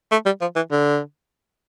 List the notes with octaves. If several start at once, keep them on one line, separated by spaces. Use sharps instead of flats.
A3
G3
F3
E3
D3